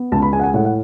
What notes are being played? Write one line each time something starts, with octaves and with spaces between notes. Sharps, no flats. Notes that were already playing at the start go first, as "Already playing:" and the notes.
Already playing: B3
C#2 A5
B5
G#3 G#5
F#5
G#5
A2 F#5
F#5